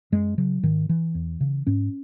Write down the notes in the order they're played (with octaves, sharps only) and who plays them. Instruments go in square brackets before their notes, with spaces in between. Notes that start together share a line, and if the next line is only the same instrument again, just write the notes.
[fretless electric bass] F#2 G#3
C#3 F#3
G#2 D#3
E3
E2
C#3
G#2 C#4